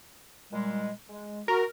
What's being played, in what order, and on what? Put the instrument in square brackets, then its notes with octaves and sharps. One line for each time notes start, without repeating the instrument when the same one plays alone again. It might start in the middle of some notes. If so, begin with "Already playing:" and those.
[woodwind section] A#2 G3 G#3
G#3
[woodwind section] F#4 [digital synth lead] A#4